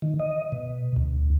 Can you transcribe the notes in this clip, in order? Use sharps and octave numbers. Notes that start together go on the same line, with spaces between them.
D#3
D#5
B2
D2